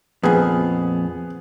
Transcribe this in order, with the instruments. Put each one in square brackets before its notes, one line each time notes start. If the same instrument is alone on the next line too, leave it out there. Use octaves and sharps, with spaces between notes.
[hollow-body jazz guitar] F2 A#2 [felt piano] B3 G#4